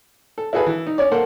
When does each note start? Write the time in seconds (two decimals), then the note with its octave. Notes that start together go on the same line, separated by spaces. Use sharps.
0.38 A4
0.53 E4 F#4 G#4 A4 B4
0.66 E3
0.87 D#4
0.98 C#4 C#5 D5
1.11 A#3 A4 A#4 C5 F#5